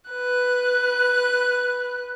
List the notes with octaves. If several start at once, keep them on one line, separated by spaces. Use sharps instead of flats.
B4 F#6